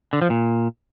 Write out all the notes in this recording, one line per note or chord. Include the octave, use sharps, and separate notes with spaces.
D3
F3
A#2